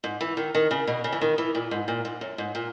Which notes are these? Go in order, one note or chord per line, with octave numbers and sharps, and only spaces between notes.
G#2
E3
D#3
D#3
C#3
B2
C#3
E3
D#3
E3
A#2
G#2
A#2
G#2
F#2
G#2
A#2